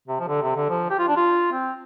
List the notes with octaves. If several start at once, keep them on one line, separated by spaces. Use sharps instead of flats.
C3
F3
D3
C3
D3
F3
G4
F4
D4
F4
C4